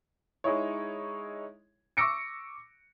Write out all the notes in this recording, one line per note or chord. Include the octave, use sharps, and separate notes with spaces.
G#3 D#4 E4 C#5
C#6 D6 E6 A#6 C#7 D7